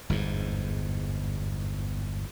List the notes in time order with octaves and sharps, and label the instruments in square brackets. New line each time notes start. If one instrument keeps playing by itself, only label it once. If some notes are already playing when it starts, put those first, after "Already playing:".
[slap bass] G1 E2 G#2